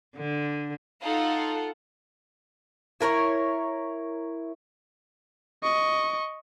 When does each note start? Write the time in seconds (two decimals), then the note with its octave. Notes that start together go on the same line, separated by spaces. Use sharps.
0.16 D3
1.02 D#4 F4 A4 F#5
3.01 E4 A#4 B4 C#5
5.63 D#5 C#6